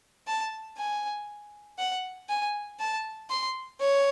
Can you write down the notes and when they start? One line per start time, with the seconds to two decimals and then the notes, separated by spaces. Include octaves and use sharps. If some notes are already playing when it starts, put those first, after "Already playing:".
0.27 A5
0.78 G#5
1.79 F#5
2.29 G#5
2.80 A5
3.30 C6
3.80 C#5